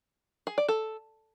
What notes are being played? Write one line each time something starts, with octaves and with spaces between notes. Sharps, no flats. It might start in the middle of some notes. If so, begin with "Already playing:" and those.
G#4
D5
A4